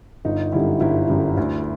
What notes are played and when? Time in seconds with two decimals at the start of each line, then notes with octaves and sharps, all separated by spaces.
0.25 G1 D#4
0.52 F#2 D3 G3 E4
0.80 G1 E4
1.09 F#2 D3 G3
1.37 D2